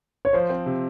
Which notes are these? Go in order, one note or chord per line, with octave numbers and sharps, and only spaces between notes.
C#5
F3 C5
C4
C3